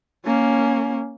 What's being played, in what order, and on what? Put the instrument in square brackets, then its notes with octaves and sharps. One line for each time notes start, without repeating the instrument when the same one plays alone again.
[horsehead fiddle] A#3 C#4